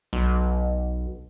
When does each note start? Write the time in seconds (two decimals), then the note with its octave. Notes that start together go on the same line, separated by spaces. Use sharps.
0.13 B1